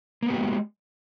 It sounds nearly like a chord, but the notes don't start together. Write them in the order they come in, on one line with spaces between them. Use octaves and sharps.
A#3 B3 G4 F#4 G#3